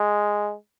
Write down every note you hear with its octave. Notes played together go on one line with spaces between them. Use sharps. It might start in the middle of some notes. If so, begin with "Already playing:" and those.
Already playing: G#3